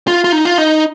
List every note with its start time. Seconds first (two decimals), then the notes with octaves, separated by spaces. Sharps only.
0.08 F4
0.24 F4
0.32 D#4
0.45 F4
0.58 D#4